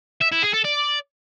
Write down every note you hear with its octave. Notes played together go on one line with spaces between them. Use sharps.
E5
E4
G#4
A4
D5